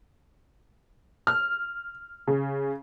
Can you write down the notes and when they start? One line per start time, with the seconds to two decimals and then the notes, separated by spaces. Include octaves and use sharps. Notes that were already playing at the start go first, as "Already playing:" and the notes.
1.27 F6
2.27 C#3